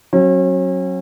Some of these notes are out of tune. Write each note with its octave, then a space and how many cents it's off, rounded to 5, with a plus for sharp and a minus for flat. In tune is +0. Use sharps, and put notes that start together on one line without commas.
F#3 +0 C#4 -40